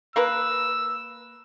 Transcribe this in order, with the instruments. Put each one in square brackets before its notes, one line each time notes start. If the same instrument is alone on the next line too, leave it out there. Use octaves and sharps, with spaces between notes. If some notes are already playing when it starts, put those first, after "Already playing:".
[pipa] A#3 A#4 B4 [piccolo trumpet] E6